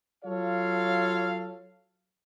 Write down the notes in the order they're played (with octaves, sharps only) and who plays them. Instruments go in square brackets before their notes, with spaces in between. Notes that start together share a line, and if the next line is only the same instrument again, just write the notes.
[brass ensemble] F#3 F4 A4 C#5 F5